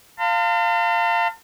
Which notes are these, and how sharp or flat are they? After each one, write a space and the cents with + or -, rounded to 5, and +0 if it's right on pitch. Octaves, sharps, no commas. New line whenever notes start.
F5 +0 A5 +45 C6 -45